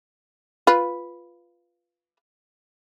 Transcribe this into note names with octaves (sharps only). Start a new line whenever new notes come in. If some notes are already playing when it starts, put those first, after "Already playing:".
F4 B4